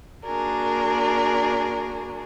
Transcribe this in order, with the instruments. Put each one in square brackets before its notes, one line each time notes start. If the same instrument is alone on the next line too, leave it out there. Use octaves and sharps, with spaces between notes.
[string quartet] A#3 D4 F#4 G#4 A#4